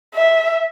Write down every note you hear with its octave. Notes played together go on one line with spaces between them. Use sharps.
E5